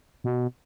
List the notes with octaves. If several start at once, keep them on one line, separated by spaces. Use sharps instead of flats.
B2